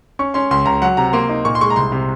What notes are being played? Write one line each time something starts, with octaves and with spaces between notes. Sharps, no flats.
C#4 C#6
C#4 C6
C#2 C6
C#2 A#5
F#3 F#5
C3 A#5
A#3 C6
D#4
A#2 C#6
C6
G#3 C#6
A#5
C2 C6
C3